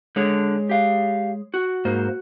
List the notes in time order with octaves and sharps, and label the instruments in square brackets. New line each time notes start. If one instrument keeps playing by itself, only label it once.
[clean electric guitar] D3 [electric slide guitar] G#3 G#4 C#5
[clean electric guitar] G4 F5
F#4
[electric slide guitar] G#2 A#3 C5